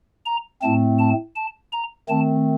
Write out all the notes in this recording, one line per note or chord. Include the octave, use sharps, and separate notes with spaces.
A#5
A2 A3 C4 A5
A5
A5
A#5
D#3 A3 C4 A5